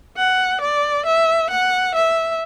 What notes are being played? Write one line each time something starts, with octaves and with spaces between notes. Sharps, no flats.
F#5
D5
E5
F#5
E5